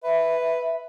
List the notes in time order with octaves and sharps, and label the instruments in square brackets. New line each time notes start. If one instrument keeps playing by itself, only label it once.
[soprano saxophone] B4 [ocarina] E5